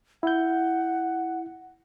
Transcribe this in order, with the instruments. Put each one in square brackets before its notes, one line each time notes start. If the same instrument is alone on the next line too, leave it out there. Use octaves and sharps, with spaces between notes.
[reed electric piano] E4 G6 [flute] F#5